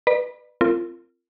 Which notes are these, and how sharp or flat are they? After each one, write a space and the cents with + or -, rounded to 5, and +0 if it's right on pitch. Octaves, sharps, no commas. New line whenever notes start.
B4 +0 D5 +40 B5 -30
C4 +0 F4 -25 A#4 -30